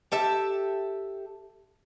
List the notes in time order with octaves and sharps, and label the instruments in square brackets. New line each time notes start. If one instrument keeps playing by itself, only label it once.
[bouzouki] G4 A4 E5